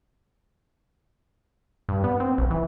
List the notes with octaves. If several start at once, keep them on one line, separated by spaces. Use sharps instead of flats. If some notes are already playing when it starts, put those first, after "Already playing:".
G2
B3
C4
B1
E3